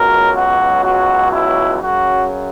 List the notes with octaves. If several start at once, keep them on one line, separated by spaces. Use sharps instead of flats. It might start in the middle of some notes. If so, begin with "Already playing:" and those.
Already playing: C#2 B2 F#3 A#4
F#4
F#4
E4
F#2 C#3 F#3 F#4